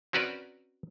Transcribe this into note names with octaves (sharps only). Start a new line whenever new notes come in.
C4 C#4 F#4 A#4 B4 D5